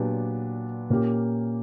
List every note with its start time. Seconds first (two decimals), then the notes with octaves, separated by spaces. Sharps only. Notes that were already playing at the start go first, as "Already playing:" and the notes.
Already playing: A#2 F#3 B3 D4 G4
0.90 A#2 A#3 C#4 G4